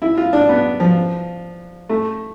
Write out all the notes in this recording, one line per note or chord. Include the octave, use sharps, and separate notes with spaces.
E4
F4
D4
B3
F3
A3